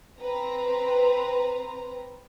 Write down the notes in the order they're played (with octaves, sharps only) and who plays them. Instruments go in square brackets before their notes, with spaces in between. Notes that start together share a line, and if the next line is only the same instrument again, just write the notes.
[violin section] C4 B4 A#5